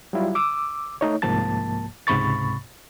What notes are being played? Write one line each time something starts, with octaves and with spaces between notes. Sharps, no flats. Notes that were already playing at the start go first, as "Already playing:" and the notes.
F#3 G3 E4 F4
D6 E6
A3 D#4 C#5
C2 G#2 F3 A#3 A5 A6
C#2 G#2 C3 B5 C#6 A6